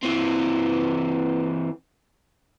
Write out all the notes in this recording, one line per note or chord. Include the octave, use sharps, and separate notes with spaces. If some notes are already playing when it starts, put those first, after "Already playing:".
E3 C4